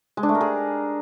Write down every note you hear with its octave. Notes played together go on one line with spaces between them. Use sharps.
G#3
D4
A3
A#4
G#4